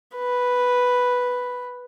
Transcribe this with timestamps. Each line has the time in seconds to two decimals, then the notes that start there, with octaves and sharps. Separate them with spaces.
0.16 B4